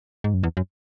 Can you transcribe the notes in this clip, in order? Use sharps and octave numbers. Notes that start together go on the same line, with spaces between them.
G#2
F#2
E2
F#2